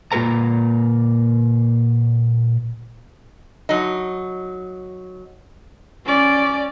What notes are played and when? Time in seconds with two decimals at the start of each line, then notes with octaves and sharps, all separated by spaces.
0.12 A#2 A#3 F4 A4 B4 A#5
3.69 F#3 D#4
6.05 C#4 D5